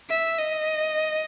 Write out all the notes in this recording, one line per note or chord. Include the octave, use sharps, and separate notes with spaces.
E5
D#5